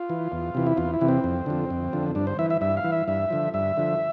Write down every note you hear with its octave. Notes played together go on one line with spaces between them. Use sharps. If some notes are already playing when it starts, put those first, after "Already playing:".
Already playing: F4
E3
E2
C3 E3
E4
E2 F4
E4
C3 E3
C4
F2
D3 F3
F2
D3 F3
G2 D4
C5
E3 E5
E5
G2 E5
F5
E3
E5
G2 E5
D3 F3
G2 E5
D3 F3